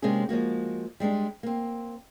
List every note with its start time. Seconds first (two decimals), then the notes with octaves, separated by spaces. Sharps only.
0.02 C3 G#3 A#3 C#4 D4 G#4
0.29 F3 G#3 A#3 F#4
1.00 G3 G#3 C#4 D4
1.43 A#3 C4